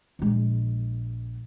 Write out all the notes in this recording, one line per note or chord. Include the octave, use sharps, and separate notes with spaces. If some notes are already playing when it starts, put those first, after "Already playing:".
A#1 G#3